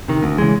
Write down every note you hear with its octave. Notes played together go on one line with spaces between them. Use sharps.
C3 D#3
D2
C#3 E3 G#3